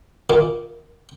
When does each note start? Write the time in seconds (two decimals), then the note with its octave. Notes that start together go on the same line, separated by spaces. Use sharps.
0.30 A#2